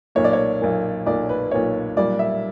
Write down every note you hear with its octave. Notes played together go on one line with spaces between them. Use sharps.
B1 A#2 A#3 C#5
D5
C#5
B1 A#2 A#3
B1 A#2 A#3 D5
B4
B1 A#2 A#3 C#5
B1 A#2 G3 A#3 D5
E5